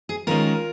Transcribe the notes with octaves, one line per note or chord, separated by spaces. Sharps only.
G#4
D#3 G#3 C#4 F4 A#4